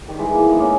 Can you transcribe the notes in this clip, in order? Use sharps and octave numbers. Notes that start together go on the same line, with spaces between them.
D#3 G3
E3 G#3
A#3
E3 G#3
B3 D#4
A#3 C#4